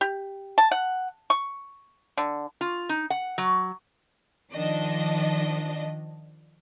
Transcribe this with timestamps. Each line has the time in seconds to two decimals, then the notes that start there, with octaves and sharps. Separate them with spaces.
0.01 G4
0.58 A5
0.71 F#5
1.30 C#6
2.17 D3
2.61 F4
2.89 D#4
3.10 F#5
3.38 F#3
4.53 D#3 F3 D4 D#5